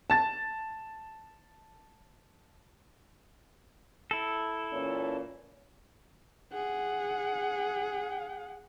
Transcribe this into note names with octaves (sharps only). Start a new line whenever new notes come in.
A5 A6
E4 A4
A#2 E3 C#4
G#4 F#5